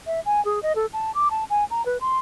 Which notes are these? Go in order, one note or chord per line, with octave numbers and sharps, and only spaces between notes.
E5
G#5
G#4
D#5
A4
A5
D6
A5
G#5
A#5
B4
C6